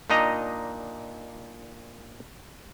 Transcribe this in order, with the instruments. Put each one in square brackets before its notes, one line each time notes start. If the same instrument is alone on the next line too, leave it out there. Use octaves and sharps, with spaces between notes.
[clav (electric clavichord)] A#2 D4 D#4 D#5 A#5